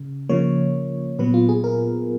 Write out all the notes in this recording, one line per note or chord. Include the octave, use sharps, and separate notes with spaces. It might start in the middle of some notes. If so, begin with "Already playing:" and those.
Already playing: C#3
C#3 F3 A#3 C#5
A#2 F#3 B3 B4
F4
G#4
A#4